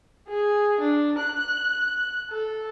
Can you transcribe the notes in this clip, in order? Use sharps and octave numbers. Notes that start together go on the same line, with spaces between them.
G#4
D4
F#6
A4